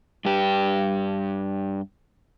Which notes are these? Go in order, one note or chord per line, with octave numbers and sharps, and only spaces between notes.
G2 G4